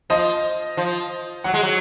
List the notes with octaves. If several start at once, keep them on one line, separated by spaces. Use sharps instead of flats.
F3 D#5
F3
F#3 F#5
G#3
F#3